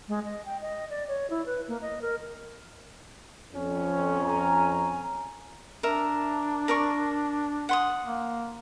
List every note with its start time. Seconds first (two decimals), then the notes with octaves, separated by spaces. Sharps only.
0.08 G#3
0.25 D#5
0.45 G5
0.61 D#5
0.90 D5
1.08 C#5
1.30 E4
1.46 B4
1.68 A#3
1.82 D#5
2.02 A#4
3.53 F2 C#4
4.22 G#5 A#5
5.83 D4 A#4 E5
6.68 A#4 D5 C#6
7.69 F#5 C6 D#6
8.05 A#3